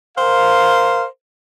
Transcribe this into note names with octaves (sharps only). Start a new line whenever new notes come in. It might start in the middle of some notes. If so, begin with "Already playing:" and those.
A#4 C5 F5